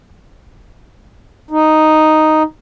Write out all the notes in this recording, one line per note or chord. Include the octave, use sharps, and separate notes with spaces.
D#4